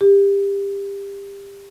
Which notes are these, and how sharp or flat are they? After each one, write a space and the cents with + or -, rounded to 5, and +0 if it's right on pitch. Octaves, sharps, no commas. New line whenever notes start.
G4 +25